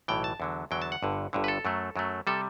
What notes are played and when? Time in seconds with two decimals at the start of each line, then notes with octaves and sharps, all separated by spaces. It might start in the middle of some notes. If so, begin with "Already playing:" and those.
0.08 B1 A2 E3 G5
0.24 A5
0.40 E2 D3 F#3
0.71 E2 D3 F#3 G5
0.82 A5
0.92 F#5
1.02 G1 G2 D3
1.33 G1 G2 D3
1.44 B4
1.48 A4
1.65 F#2 F#3 A3
1.96 F#2 F#3 A3
2.27 C3 G3 A4